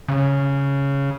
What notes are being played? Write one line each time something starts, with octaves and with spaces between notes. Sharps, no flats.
C#3